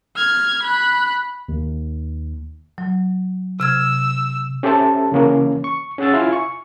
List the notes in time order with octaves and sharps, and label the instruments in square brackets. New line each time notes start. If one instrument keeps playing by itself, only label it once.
[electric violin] F6 G#6
B5 F#6
[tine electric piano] D#2
[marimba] F#3
[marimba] C3 F6 G#6 [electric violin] E6
[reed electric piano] C#4 G4 A4 C5 E5 A5
C#3 E3 A#3 C#4 A#4
C#6
C#4 G#4 F#5 E6 A6
E4 F4 E5 F5 G#5
C#6